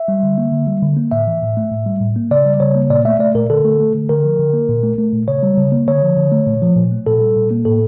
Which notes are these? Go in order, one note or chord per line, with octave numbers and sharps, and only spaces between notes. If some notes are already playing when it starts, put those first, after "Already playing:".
Already playing: E5
G3
D3
A#3
D3
G3
D3
A#3
A2 E5
E3
A2
A3
A2
G3
A2
A#3
C#3 D5
G3
C#3 C#5
A#3
A#2 D5
A3 E5
A3 D5
A#2 A#4
D3 A4
A3
A3
D3
D3 A#4
F3
D3
A#3
A#2
A3
A3
A#2
C#3 C#5
G3
C#3
A#3
D3 C#5
F3
D3
A3
A#2
F3
A#2
A3
A#2 A4
G3
A#2
A#3
A2 A4